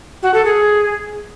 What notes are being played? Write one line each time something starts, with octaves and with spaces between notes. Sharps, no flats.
F#4
A4
G#4